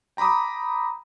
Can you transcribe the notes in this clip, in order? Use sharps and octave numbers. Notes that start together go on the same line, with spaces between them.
G5 A#5 B5 D6 D#6